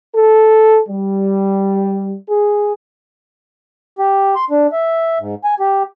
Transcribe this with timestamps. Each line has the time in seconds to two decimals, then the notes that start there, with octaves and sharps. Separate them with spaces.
0.15 A4
0.89 G3
2.29 G#4
3.99 G4
4.36 C6
4.50 D4
4.72 E5
5.20 G#2
5.44 G#5
5.60 G4